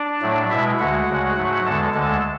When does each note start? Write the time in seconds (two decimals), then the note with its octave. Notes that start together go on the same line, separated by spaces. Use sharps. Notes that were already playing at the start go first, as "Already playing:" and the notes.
Already playing: D4 D5
0.21 A2 F#3 A3
0.50 B2 G#3 E4 E5
0.79 D2 D3 G#3 F#4 F#5
1.08 D2 C#3 G#3
1.37 G#2 F#3 A3
1.65 E2 D3 G#3 A4 A5
1.94 D2 D3 G#3 A4 A5